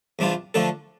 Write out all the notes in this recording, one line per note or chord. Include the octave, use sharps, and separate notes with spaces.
E2 C3 G3 D4 F4
D3 F3 A3 D4 A4